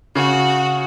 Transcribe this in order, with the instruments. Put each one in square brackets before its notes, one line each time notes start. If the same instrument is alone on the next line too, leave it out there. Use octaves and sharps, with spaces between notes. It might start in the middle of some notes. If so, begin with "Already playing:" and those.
[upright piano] C#3 [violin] F#4